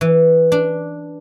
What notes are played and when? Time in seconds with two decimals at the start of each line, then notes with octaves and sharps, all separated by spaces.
0.01 E3
0.52 D4